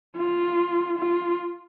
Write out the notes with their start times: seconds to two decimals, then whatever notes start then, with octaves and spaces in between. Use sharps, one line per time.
0.17 F4
0.98 F4